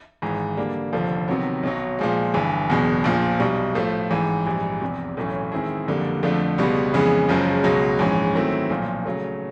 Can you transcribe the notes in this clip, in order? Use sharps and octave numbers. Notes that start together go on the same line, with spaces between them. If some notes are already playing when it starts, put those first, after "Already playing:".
G#1 G#2 E3
D3 G3 A#3 D4
F1 D#2 D3 F3
C3 D#3 F#3 B3
B1 B2 F#3
A#2 F3 G#3
G1 G2 E3
F#1 E2 B2
A#1 A#2 F3
B1 B2 G3
A2 F3 A3
A1 G#2 E3
A#1 G#2 E3 G3
F1 E2 C3
B1 A2 E3 A3 C#4
D#3 G#3 C4 E4 G#4
F#1 F2 D3 G3 A#3
F2 D3 F3 A3 D4
C#2 B2 G3 B3
F2 C#3 E3 G#3 B3
F#1 F#2 C#3 F3 G#3
C#2 B2 F#3
A#1 G#2 E3 G#3 C#4
D#3 F#3 A3 C4 E4
B1 A#2 F3
C#3 F#3 A3